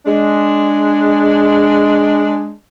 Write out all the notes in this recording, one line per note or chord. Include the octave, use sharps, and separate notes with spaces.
G#3 D4